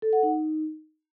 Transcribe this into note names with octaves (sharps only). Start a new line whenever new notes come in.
A4
F#5
D#4